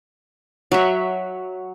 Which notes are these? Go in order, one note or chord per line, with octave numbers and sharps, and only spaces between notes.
F#3 E5